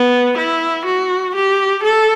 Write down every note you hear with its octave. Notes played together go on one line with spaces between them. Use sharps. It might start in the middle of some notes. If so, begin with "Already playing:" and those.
Already playing: B3
E4
F#4
G4
A4